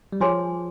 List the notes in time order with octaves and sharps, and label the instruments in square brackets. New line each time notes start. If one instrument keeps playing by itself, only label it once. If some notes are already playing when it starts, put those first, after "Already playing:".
[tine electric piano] G3
[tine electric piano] F3 [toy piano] G#4 C#5 G#5 C6